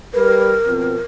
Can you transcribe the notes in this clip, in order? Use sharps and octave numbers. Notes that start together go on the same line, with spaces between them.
G3 A#4 B4
B2 F3 C4